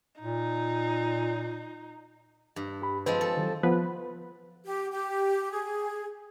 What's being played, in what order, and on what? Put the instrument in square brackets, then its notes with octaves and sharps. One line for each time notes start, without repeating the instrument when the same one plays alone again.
[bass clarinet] A#2 [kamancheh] D#4
[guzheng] G2
[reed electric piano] G4 B5
[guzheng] F3 G#3 C4 [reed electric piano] B4
[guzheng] A4
[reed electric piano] D#3 F#3
[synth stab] F3 B3 B4
[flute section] G4
G4
G#4